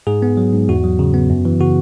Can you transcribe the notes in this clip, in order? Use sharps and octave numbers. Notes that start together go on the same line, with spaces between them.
G#2 G#4
B3
F#3
G#2
E2 F#4
F#3
C#3
B3
F#2
E3
C#3 F#4